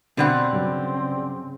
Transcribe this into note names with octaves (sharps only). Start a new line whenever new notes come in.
B2 D3 G3 C4 F#5
G2 C#3 F#3